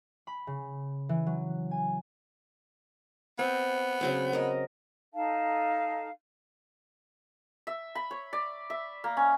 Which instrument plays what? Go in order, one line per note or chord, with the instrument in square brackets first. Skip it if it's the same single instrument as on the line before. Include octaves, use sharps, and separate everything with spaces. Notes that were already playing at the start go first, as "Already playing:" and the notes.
[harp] B5
C#3
E3
F#3
G#5
[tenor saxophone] B3 [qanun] C4
[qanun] C#3 F#3 C4
A#4 D#5
[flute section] D#4 A4 F5 A5
[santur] E5
B5
C#5
D5
E5
A#3
C#4